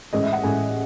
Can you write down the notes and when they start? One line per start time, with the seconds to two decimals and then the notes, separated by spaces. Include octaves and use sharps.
0.13 A1 A2 G#3 D#5
0.23 E5
0.33 F#5
0.43 A1 A2 G#3 G#5